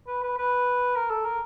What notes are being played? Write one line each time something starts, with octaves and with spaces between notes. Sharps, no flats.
B4
B4
B4
A#4
A4
A#4